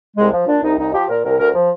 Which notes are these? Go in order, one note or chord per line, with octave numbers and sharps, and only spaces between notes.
C2 G#3
F3
A#2 D4
C2 D#4
C2 D#4
F3 G4
A#2 A#4
C2 A#4
D2 A#4
F3